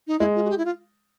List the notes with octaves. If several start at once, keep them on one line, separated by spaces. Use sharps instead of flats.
D#4
G#3 E4
F4
F#4
G4
E4
F4